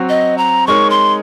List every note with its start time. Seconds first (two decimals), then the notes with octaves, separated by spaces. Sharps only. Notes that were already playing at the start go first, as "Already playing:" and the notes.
Already playing: F#3 C4 F#4
0.09 D#5
0.38 A#5
0.67 G#3 D#4 A#4 C#5 C#6
0.90 C6